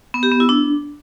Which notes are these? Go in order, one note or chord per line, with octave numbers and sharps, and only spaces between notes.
B3
G4
B3
E4
D4